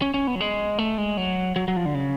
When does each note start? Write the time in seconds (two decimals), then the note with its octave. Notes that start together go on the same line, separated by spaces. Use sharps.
0.02 C#4
0.14 C#4
0.27 B3
0.35 F#3
0.40 G#3
0.78 A3
0.98 G#3
1.17 F#3
1.56 F#3
1.68 F#3
1.76 F3
1.85 D3
1.94 C#3